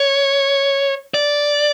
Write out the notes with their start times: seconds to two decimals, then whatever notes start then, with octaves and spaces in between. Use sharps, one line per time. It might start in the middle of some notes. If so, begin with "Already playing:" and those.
Already playing: C#5
1.14 D5